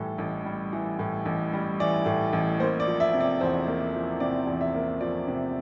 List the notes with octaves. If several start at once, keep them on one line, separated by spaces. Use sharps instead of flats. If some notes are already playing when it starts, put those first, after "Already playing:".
Already playing: A2 E3 G3 A4
A1
G3
E3
A2
A1
G3
E3 D5
A2
A1
A#3 C5
D5
F3
E5
C3
D5
E2 C5
A#3
F3
C3 D5
E2
E5
A#3
F3 D5
C3